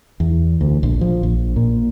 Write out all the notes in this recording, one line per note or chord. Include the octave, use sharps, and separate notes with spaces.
E2
D2
A#1
F3
A#1
A#2